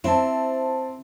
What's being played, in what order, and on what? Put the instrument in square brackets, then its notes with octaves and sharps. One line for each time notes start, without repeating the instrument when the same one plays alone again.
[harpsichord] C4 [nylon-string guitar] E4 [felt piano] C5 A5